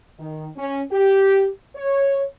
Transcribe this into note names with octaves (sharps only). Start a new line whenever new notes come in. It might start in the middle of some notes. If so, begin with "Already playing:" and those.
D#3
C#4
G4
C#5